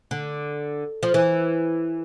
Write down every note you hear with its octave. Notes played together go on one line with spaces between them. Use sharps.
D3
F3
E3